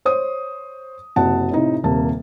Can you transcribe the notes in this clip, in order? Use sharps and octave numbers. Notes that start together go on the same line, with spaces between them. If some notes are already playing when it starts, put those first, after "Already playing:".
C5 C#5 D#6
F#1 C3 F#3 F#5 A5
A2 C3 D#4
D#1 C3 A#3 A5